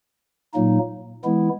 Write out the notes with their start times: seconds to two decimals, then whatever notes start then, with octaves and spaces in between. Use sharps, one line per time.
0.54 A#2 F#3 A#3 D#4
1.24 E3 G#3 B3 E4